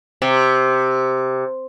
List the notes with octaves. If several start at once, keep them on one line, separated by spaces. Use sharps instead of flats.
C3